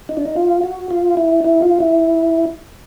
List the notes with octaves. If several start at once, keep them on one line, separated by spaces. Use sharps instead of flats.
D#4
D4
D#4
F4
F#4
F4
E4
E4
F4
E4